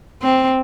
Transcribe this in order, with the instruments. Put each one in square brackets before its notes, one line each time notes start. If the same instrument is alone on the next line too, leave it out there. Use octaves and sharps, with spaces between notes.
[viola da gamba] C4